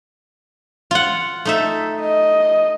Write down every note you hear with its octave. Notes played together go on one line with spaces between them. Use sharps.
F4 F#5
A3 D#4 E5
D#5